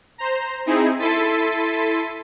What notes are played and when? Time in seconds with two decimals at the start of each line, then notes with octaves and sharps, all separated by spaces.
0.18 C5 A#5
0.66 C4 D#4 E4 G#4
0.98 E4 A4 C6 A6 B6 D#7